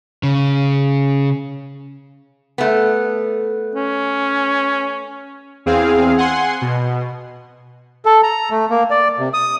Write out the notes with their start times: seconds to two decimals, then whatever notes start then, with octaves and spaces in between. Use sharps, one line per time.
0.23 C#3
2.58 A3 B3
3.75 C#4
5.66 E2 C4 G#4 F5
6.18 F#5 G#5 C6
6.61 B2
8.05 A4
8.23 A#5
8.51 A3
8.70 A#3
8.91 D5
9.19 C3
9.34 D#6